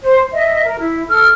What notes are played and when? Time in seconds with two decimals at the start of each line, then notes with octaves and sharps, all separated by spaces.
0.02 C5
0.33 D#5 E5
0.64 A#4
0.79 E4
1.08 A4 F6